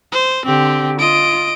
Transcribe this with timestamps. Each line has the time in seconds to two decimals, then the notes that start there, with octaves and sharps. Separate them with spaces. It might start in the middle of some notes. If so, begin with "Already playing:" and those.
0.12 C5
0.45 D3 C4 G4
0.99 F4 D#5 D7